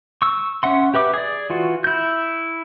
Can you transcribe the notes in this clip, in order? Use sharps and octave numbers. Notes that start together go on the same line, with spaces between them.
C#6 E6
C#4 E5 F#5 C6
G4 B4 E5 D6
G#4 D5
E3 F4 F#4
E4 G6